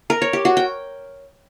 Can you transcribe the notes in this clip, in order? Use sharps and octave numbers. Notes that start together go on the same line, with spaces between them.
A#4
C#5
G4
F#4
G5